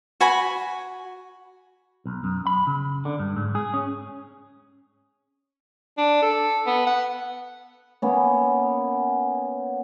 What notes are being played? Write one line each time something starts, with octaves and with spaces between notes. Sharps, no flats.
F#4 G#5 B5
B1
F#2
B5
C#3
D3
G2
G#2
G#4
C#4
D4
A4
B3
F#5
A#3 B3 C#4